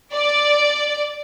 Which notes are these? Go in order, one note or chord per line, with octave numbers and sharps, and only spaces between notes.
D5